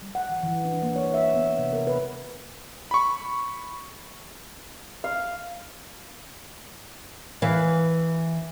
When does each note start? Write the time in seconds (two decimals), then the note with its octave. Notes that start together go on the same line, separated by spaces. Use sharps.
0.02 G3
0.15 F#5
0.29 E3
0.43 E3
0.65 D4
0.83 A#3
0.96 C#5
1.14 E5
1.35 B3
1.58 C3
1.73 A#4
1.87 B4
2.91 B5 C#6
5.04 F5
7.42 E3 B4 F5